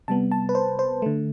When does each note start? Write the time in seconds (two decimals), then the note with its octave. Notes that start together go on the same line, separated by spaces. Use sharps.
0.08 C3 G3 B3 A5
0.32 A5
0.49 B4
0.55 C5
0.79 C5
1.02 D3 A3